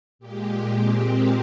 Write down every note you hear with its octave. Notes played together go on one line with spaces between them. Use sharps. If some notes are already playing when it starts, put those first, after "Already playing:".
A#2 G#3 G4
C4
A#3